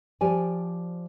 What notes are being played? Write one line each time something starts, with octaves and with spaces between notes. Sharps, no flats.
F3 G4 D5 G#5